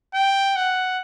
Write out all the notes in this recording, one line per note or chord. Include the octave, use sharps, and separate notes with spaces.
G5
F#5